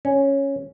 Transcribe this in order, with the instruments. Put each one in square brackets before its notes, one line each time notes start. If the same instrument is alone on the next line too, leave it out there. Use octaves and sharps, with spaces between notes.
[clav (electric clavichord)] C#4